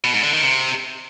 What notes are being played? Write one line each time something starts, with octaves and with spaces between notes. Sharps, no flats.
B2
G#2
D3
D#3
C3